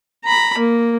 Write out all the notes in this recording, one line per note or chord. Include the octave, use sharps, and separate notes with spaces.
A#5 B5
A#3